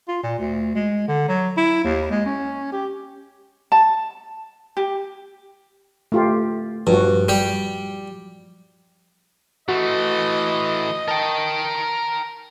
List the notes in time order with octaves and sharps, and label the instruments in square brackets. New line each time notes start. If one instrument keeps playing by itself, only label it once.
[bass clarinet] F4
A#2
D2
G#3
D3
F#3
E4
D#2
G#3
C#4
G4
[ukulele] A5
G4
[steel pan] A3 F4 G4
[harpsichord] G2 [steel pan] F3 F#4
[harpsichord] G3 G4
[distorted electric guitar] E3 A3 [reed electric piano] F#4 [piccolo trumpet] D#5
[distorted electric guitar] A#4 G5 [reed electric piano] A5